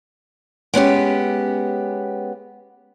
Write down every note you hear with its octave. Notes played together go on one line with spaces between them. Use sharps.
G#3 B3 C#4 G4